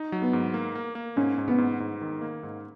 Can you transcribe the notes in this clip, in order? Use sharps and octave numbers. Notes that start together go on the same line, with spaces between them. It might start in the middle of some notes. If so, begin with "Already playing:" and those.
Already playing: D#4
F#3
B3
G#2
A#3
A#3
A#3
G#2 C#4
G#2
B3
G#2
G#2
D#3
A#3
G#2